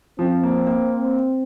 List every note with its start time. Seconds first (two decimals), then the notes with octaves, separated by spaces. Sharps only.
0.19 F3 C4
0.43 A#3
0.67 A#3